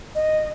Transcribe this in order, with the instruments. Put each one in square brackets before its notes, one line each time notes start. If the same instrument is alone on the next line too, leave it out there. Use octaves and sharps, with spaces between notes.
[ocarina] D#5